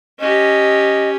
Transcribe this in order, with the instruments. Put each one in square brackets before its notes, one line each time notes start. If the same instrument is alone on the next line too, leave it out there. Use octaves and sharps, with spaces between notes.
[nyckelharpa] C#4 G4 [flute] D#5